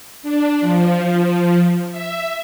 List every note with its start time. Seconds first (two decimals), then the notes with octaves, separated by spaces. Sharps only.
0.23 D4
0.61 F3
1.91 E5